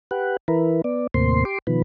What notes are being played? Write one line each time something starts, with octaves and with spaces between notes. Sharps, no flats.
G4 B4 F#5
E3 E4 A#4 B4
B3 D5
D#2 A2 C3 A#3 C5 C6
G4 C6 D6
B2 D#3 F3 B4